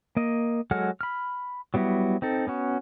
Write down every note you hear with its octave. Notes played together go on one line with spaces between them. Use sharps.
A#3 D#5
F#3 G#3 A4 F#5 F6
B5 F6
F#3 G3 B3 E4 F#4
C4 D#4 A4
B3 C#4 F#4